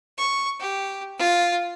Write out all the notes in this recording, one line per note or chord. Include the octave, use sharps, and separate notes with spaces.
C#6
G4
F4